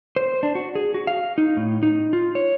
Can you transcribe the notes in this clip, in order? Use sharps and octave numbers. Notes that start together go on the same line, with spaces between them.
C5
D4
F#4
G#4
F#4
F5
D#4
A2
D#4
F4
C#5